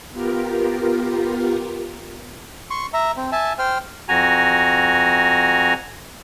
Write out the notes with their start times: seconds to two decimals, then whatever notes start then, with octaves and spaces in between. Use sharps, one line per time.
0.10 B3 F4 G4 A#4
2.70 C6 C#6
2.94 E5 A#5
3.17 C4
3.32 E5 G#5 A5
3.59 C5 G5 F6
4.09 F2 F#4 G#5 A#5